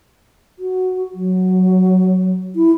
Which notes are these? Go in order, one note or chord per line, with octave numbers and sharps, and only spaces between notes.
F#4
F#3
E4